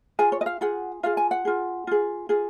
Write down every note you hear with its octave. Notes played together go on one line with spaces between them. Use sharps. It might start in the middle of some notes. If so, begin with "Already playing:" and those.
F4 G#4 G#5
C#5
D#5
F5
F4 G#4 F#5
F4 G#4 F5
G#5
F#5
F4 G#4
F4 G#4
F4 G#4